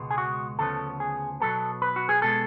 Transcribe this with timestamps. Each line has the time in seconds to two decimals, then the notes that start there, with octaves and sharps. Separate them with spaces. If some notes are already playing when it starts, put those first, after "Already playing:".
Already playing: C#2 B2 G#3 B3
0.11 G#4
0.18 F#4
0.59 D2 C#3 F3 B3 A4
1.00 G#4
1.40 B2 F#3 B3 A4
1.82 B4
1.96 F#4
2.09 G#4
2.22 B2 G#3 B3 A4